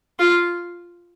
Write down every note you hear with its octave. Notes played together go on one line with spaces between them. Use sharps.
F4